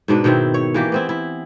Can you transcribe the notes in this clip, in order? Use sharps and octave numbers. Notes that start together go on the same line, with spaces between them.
G#2 B2 D4 B4
B2 D#3 C4 E4
C#5
E3 A#3 G4
B3 C4 E4
E4